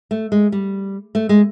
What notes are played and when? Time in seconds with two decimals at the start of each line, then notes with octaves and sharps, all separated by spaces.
0.11 A3
0.32 G#3
0.52 G3
1.15 A3
1.29 G#3